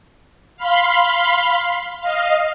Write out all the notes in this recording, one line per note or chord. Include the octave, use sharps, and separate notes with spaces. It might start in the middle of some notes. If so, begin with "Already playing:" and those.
F5 B5 C6
D#5 F5